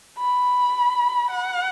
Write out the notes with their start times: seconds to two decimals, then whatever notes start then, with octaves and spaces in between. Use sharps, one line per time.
0.18 B5
1.30 F#5